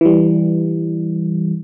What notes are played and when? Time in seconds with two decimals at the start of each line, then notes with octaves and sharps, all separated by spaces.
0.01 E3 G3